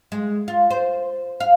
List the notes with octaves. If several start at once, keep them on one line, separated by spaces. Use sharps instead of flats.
G#3
F4
C5
F5